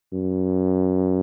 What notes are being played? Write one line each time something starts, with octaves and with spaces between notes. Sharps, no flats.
F#2